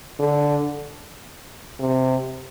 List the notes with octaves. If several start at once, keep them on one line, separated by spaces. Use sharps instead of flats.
D3
C3